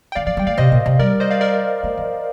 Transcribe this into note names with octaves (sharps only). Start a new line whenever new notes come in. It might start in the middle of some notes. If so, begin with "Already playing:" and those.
G5
D#3 D5 F5
F3 D5 F5
G3 G5
A3 D5 F5
C3 C5 D#5
A#2
C3
G3 A#4 D5
C5 D#5
D5 F5
A#4 D5
A3
F3